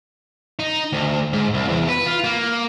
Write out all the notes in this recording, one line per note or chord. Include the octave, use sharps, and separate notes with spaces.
D#4
D2
G#2
C2
E2
B4
F4
A#3